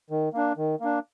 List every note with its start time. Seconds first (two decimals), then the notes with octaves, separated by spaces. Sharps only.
0.10 D#3
0.33 A#3 D4
0.57 D#3
0.81 A#3 D4